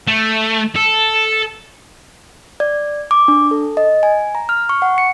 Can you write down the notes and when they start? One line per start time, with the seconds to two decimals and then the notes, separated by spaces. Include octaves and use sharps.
0.07 A3
0.76 A4
2.60 D5
3.11 D6
3.28 D4
3.51 A4
3.77 D#5
4.03 G#5
4.35 A#5
4.49 F6
4.69 C#6
4.82 F#5
4.98 C#7